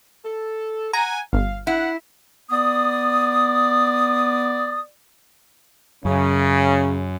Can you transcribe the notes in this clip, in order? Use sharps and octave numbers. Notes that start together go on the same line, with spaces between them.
A4
F#5 G#5 A#5
G1 F5
E4 F#5
B3 D5 D#6
F#2 C#3